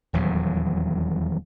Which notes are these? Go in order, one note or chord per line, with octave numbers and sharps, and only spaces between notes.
D#1 E2 F#3